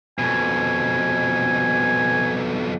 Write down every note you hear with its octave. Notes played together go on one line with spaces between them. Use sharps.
F2 B2 G#5